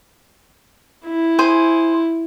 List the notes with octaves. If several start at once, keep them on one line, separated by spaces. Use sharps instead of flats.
E4
G#4 C5 G#5